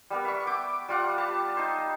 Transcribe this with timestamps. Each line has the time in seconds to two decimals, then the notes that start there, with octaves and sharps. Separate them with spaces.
0.10 G3 B3 A#4
0.25 E5 F#5 B5 C#6
0.47 G5 D6 E6
0.89 G3 F4 F#5
1.18 G4 B4 A5
1.57 D#4 C5